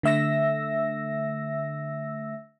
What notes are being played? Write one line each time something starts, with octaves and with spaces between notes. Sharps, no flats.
D3 A3 E5 E6 A#6